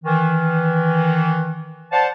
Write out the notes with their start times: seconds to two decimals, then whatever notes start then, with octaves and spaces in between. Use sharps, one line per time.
0.04 D#3 E3
1.92 C5 D5 F5 F#5 A5